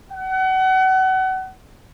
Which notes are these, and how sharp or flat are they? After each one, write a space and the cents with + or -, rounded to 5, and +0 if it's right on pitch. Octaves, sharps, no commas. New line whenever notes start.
F#5 +30